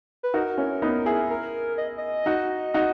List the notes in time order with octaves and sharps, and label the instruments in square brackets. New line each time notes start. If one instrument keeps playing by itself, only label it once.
[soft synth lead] B4
[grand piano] D#4 F#4 [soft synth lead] A#4
[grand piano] C#4 E4
B3 D#4
E4 G#4
[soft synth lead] A#4
D#5
D#5
[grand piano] D#4 F#4
D#4 F#4